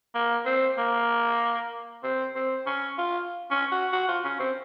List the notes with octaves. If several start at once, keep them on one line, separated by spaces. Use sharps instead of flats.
A#3
C4
A#3
C4
C4
C#4
F4
C#4
F#4
F#4
F4
C#4
C4